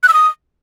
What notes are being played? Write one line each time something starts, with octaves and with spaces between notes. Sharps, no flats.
F#6
E6
D#6